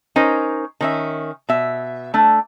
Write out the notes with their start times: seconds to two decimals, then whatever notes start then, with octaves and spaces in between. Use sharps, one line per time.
0.16 C#4 D#4 A#4 C5
0.81 D#3 C#4 E5
1.49 B2 E5
2.14 A3 D4